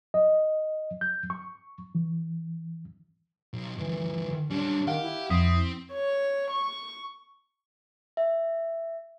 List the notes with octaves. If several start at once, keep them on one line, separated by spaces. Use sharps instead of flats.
D#5
G6
C#6
E3
B1
D2 G2 E3
G3 C#4 D4
D#3 G4 F5 F#5
E4
F2 C4 D#6 B6
C#5
C#6
E5